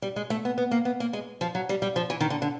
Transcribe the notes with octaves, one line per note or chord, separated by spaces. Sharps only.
G3
G#3
A3
B3
B3
A#3
B3
A#3
G#3
F3
F#3
G3
G3
F3
E3
D#3
D3
D3